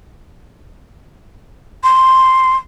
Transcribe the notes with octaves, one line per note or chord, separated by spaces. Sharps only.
C6